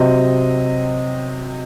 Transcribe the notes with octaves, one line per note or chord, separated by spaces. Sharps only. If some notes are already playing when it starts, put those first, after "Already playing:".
Already playing: C3 F#3 C4 D#5